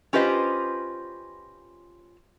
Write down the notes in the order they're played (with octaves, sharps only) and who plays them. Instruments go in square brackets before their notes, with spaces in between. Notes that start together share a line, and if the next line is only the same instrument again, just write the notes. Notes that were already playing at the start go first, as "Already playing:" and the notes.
[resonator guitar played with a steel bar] C#4 F4 G4 B4 C5 D#5